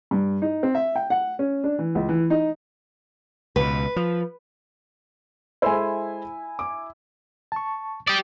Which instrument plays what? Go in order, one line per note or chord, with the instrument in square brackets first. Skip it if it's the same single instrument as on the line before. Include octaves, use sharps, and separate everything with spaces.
[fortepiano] G2
D#4
C4
E5
G5
F#5
C#4
D4
E3
C#2
E3
D#4
[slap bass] C#2 B2 [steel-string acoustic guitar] B4
[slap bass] F3
[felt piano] G#3 A4 C5 [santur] E4 G#5
[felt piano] D6
[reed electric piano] A5 C#6
[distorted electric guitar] G4 D5 [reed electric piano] D#6